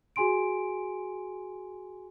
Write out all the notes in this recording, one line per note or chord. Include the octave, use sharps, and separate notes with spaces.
F#4 G#4 G#5 C6 D7